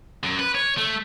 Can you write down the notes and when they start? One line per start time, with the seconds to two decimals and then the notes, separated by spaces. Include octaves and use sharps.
0.23 F#2
0.39 B4
0.55 C#5
0.77 A3